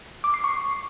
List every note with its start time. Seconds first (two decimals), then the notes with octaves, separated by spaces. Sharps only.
0.24 D6
0.34 C7
0.44 C#6